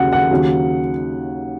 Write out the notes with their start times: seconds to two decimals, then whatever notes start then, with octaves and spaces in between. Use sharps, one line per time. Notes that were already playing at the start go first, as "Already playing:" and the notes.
Already playing: D#2 C#3 F#3 F#5
0.13 F#5
0.31 D#2 C#3 F#3